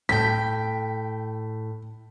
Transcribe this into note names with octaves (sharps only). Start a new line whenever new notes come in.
A2 G5 B6